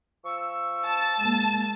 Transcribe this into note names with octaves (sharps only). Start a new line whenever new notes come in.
F3 C#6 E6
A5
G#3 A#3